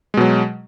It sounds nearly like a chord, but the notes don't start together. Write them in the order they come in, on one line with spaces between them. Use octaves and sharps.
G#3 B2 F#3